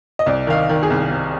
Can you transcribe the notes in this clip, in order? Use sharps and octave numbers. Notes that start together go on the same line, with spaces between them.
D#5
C2 D5
D#3 F5
D#5
D#3
G#4
C2
C3